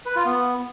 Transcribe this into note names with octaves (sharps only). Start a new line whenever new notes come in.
B4
F4
B3